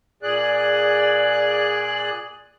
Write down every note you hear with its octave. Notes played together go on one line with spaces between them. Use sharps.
A#2 G#4 D5 F#6